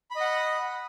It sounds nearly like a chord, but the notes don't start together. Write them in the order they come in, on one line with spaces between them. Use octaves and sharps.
B5 D#5 F#5